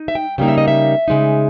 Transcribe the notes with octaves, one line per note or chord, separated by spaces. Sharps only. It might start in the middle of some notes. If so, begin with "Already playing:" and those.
Already playing: D#4
E5
G5
C#3 G3 A#3 D#4 G5
E5
D#5
E5
C#3 G#3 D#4